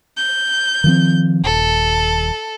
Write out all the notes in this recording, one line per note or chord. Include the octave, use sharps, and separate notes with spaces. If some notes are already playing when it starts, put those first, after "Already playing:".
G6
D#3 F3 C4
D#1 A4